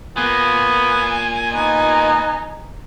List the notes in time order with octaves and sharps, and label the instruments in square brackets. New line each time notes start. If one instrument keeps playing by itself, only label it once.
[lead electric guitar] A#2 A#3 [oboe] B3 [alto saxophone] G#5
[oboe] B3 [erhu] D#4